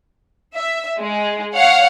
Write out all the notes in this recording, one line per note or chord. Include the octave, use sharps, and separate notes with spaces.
E5
G#3
C#5 F5 F#5